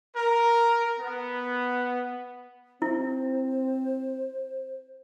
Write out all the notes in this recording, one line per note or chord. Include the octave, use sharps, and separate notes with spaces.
A#4
B3
C4 E4 C5